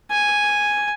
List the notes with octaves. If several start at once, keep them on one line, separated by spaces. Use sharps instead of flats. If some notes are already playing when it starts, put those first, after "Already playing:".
G#5